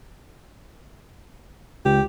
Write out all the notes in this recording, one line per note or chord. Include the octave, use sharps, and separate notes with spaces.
C#2 G4